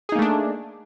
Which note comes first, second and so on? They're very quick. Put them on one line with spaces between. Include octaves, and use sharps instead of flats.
G#4 D#4 A#3 A3 D4